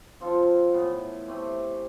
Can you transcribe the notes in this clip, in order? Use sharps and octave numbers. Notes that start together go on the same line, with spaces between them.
F3 C4 F4 A4
A2 E3 B3
A3 C4 G4 B4